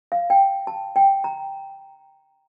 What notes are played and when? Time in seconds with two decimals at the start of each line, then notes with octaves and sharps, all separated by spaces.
0.12 F5
0.30 G5
0.67 A5
0.96 G5
1.24 A#5